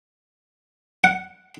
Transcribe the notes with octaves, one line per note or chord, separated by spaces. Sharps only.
F#5